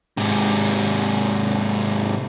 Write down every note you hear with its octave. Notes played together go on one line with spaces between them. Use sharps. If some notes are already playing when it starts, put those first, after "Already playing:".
G#2 C3